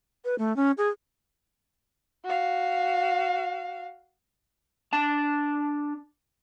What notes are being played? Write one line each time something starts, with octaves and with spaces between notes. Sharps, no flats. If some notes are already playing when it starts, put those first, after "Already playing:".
B4
A3
C#4
G#4
F#4 F5
D4 A5